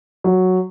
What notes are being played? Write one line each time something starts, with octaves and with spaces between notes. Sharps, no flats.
F#3